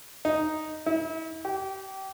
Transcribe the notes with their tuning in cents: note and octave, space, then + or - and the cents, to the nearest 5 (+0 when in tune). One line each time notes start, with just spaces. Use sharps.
D#4 +0
E4 -40
G4 -25